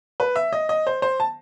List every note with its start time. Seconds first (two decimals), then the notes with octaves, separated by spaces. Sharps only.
0.20 B4
0.36 E5
0.53 D#5
0.69 D#5
0.87 C5
1.02 C5
1.20 A5